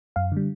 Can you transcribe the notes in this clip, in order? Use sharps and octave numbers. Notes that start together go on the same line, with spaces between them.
F#2 F5
D3 G3